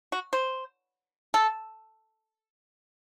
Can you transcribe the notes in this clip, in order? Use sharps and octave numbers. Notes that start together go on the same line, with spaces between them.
F#4
C5
A4